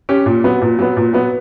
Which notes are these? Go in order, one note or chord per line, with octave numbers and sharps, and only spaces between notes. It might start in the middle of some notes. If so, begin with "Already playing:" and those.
C#4 G4
A#2
F#3 B3
A#2
F#3 B3
A#2
F#3 B3